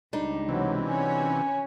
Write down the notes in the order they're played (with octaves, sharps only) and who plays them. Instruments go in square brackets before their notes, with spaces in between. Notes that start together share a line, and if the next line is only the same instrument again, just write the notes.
[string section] C#2 [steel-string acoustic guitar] G3 D4 D#4
[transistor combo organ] C3 E3 [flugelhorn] F#3
[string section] C#4 F#4 C#5 [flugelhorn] G#5